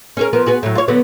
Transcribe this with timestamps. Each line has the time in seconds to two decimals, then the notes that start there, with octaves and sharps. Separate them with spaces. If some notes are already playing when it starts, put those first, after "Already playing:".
0.17 C#4 G#4 A#4
0.33 F3 B3 A#4
0.46 B3 F#4 G#4
0.63 A2 F#3
0.75 F4 C#5
0.88 D3 F#3 B3